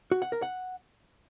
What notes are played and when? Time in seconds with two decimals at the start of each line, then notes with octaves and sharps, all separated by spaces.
0.11 F#4
0.22 F#5
0.32 A#4
0.42 F#5